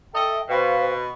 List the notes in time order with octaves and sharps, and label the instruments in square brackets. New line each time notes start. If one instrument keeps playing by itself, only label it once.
[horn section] A4 D#5 [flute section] E5 G5
[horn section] B2 [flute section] C5 F5 G5